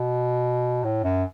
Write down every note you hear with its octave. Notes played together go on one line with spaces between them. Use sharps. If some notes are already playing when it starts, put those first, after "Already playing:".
Already playing: B2
A2
F#2